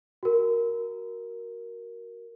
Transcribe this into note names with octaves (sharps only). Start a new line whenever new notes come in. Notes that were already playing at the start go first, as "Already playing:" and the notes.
F#4 A#4